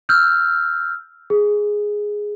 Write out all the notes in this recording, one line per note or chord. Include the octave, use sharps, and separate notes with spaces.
E6 F6 G6
G#4